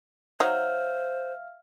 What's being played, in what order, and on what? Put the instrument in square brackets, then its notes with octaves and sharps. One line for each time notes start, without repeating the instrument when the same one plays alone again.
[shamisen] F#3 D#4 [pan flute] C5 [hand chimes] E5 F5 F6